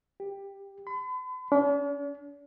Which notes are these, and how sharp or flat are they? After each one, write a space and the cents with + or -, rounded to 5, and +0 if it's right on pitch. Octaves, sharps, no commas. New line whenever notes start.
G4 +10
B5 +45
D4 -45